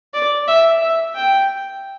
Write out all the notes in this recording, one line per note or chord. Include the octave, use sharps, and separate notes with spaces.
D5
E5
E5
G5